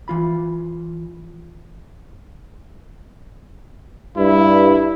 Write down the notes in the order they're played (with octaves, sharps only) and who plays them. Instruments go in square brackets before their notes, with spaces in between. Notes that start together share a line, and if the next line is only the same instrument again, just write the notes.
[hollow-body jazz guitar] E3 F4 B5
[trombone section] G2 [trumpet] E4